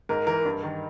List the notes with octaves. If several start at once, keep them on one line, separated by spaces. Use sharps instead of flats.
G#2 A#4
E3 A#4
G2
D#3